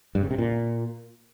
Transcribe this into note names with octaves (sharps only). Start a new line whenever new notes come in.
G2
C#3
C3
A#2